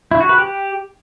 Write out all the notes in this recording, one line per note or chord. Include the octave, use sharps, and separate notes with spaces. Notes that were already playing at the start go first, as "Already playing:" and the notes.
E4
F#4
B4
G4